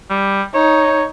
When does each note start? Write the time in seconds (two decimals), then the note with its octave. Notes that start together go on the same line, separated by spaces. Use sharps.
0.10 G3
0.54 D#4 C#5